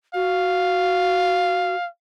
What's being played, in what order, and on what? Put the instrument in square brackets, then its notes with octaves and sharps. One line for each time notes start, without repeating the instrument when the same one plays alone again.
[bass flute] F#4 [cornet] F5